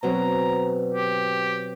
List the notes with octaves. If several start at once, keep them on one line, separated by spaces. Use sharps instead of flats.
B2 F#3 C4 A#5
G4